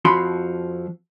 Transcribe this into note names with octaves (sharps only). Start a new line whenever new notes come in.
F2 F3 F#4 B5 C6